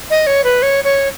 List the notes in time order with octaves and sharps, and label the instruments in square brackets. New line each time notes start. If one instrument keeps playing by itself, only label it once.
[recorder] D#5
C#5
B4
C#5
C#5